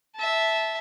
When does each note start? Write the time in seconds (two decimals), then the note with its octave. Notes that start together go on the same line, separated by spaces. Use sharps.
0.16 E5 A5